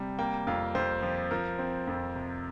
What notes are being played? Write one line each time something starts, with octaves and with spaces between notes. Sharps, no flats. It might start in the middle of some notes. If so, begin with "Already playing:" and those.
Already playing: C3 G3
A#3 G5
F2 F5
F2 C5
F3
F3 A#4
C4
F2
C3